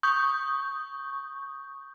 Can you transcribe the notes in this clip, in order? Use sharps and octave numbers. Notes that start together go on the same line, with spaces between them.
C#6 D#6 G6